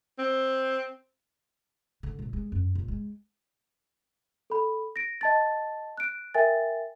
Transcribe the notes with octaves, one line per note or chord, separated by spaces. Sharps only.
C4
D3
A#2
G#3
F#2
A#2
G#3
A4 B5
A#6 D7
D#5 A5 A6
F#6 D7
A#4 E5 G5 G#5 A6